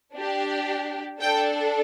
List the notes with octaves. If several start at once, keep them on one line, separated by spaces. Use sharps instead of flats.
D4 G4
D4 A4 G5